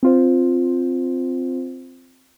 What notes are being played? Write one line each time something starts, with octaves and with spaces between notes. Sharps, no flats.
C4 F4 C5